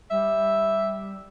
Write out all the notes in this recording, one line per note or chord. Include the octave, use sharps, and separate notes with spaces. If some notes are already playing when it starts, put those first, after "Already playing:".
G3 E5